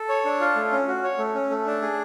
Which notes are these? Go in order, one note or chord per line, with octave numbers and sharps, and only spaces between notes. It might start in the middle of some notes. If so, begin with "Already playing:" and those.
Already playing: A4
C#5
D4
F4
A3
C#4
F#4
C#5
A3
C#4
A3
D4
G#4